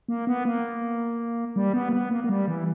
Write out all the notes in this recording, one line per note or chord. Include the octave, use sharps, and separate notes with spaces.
A#3
B3
A#3
G3
B3
A#3
B3
A#3
A#3
G3
E3